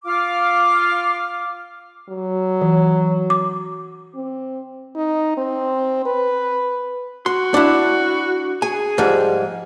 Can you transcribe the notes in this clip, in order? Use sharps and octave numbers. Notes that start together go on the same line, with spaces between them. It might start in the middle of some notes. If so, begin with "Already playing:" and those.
F4 F5 D6 F6
F#3
E3
D6
C4
D#4
C4
B4
F#4 C6
D4 E4
G#4 G#5
G#2 F3 G3